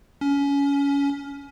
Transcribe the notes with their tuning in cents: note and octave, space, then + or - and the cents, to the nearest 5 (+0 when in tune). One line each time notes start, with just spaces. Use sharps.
C#4 +25